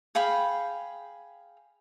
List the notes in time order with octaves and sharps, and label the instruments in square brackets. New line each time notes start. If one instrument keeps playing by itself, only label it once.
[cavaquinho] G#4 F5 G5 B5